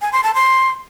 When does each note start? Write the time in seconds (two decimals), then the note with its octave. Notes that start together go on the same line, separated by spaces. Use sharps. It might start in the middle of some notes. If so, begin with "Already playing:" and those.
0.02 G#5
0.12 C6
0.23 A5
0.34 C6